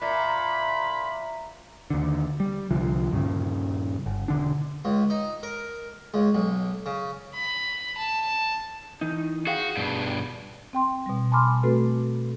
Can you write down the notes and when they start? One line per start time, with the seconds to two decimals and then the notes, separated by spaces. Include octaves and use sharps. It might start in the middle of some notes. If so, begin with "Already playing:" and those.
0.02 A#2 E5 A#5 B5
1.90 D#2 D3
2.40 G3
2.71 C2 D3 F3
3.11 D#1 G2 C#3
4.06 G1
4.28 E1 D3 D4
4.85 C#2
5.10 D#4
5.43 A#4
6.14 C#2
6.35 B1
6.86 C#3
7.34 B5
7.97 A5
9.01 E3 D#4
9.47 F#4 G#4 F5 G5
9.77 G2 B2
10.73 C4 G5 C6
11.06 B2 G3
11.32 G#5 A5 B5 C6 D6 F6
11.63 A3 C4 F#4 A4 B4